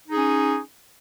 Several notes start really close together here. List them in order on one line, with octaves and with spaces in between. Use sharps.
D#4 G#4 C#4